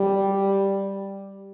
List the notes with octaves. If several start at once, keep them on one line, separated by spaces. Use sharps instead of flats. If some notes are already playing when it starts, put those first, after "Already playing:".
Already playing: G3